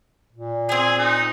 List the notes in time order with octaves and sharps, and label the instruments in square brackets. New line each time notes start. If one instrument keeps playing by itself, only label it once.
[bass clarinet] A#2
[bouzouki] C4 G#5 [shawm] G#4
[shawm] D#4